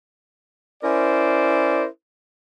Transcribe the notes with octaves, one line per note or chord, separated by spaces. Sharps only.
C#4 E4 A#4 C5 D5